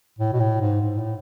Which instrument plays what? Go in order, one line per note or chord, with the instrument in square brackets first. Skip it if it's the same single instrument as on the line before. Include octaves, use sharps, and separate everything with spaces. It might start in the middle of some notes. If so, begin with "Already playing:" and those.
[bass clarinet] A2
B2
A2
G#2
G#2
A2